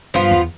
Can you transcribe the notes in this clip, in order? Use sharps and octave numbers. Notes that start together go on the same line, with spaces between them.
G2 F3 B3 F4
E2